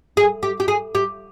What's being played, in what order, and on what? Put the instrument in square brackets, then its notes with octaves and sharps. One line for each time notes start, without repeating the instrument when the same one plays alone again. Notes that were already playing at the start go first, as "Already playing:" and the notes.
[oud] G#4
G4
G4
G#4
G4